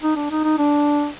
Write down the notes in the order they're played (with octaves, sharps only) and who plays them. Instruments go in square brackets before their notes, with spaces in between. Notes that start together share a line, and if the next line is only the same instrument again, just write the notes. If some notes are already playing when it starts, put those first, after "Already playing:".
[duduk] D#4
D4
D#4
D#4
D4